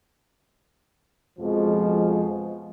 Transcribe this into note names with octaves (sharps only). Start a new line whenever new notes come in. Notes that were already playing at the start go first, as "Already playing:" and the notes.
F2 B2 F3 G#3